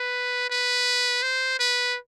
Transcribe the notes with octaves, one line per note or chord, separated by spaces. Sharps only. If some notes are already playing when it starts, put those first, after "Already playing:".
Already playing: B4
B4
C5
B4